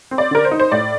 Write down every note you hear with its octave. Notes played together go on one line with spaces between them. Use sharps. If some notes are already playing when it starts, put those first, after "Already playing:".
C4
D5
D3 A#4
C5
D#4
C5
A2 D5